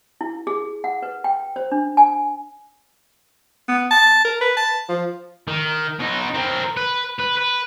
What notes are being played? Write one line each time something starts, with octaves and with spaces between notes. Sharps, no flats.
E4
G#4
F#5
B4
G5
C5
D4
G#5
B3
A5
A#4
B4
A5
F3
D#3
B2 D#4
C4 A#4
B4
B4
B4